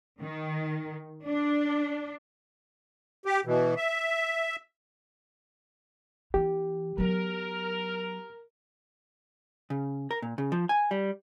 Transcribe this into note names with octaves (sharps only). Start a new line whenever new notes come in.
D#3
D4
G4
B2 E3
E5
E3 B3 G4
F#3 B3 A#4
C#3
A#4
A#2
C#3
F3
G#5
G3